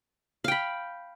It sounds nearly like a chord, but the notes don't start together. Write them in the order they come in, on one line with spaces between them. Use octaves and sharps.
F5 G5 B5